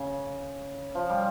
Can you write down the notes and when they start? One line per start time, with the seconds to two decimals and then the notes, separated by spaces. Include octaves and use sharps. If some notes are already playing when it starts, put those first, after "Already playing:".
Already playing: C#3
0.95 F3
1.09 G3